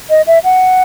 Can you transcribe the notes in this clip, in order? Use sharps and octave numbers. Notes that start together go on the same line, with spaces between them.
D#5
E5
F#5